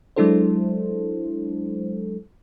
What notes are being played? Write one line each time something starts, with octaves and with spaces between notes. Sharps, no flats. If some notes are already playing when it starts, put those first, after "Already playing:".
F#3 G#3 D4 E4 A4 C5